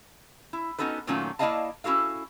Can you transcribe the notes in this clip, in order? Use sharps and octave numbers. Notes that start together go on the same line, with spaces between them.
E4
B3 C#4 D#4 F#4 A4 B4
A#2 D#3 F#3 A3 C#4 F4
A#3 E4 D5 D#5 F5 A5
C#4 E4 F#4 A4 F5